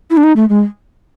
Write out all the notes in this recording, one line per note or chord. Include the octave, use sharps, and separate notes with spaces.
E4
D4
D#4
A3
G#3